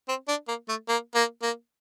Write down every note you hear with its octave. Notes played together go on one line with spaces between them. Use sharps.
C4
D4
A#3
A3
A#3
A#3
A#3